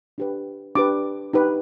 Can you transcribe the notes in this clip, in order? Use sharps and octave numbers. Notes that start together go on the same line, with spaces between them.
D4 G4 B4
D4 G4 B4 D6
D#4 G4 B4